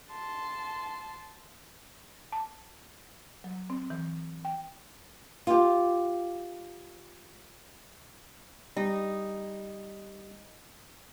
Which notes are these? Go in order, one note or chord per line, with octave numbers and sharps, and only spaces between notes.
A5 C6
A5
F#3
C4
E3
G5
F4 G4
G3 D#4